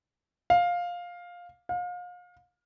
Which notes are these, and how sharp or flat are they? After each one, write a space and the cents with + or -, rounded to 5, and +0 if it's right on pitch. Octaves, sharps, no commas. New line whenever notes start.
F5 +10
F5 +35